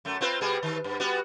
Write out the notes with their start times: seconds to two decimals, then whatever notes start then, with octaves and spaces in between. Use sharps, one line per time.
0.05 F#2 A3
0.21 C4 F4 B4
0.41 B2 G3 G#4
0.63 D#3
0.84 G2
1.00 G3 B3 F#4